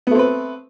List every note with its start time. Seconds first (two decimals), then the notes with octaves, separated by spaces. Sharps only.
0.07 B3
0.11 A3
0.15 C4
0.19 B4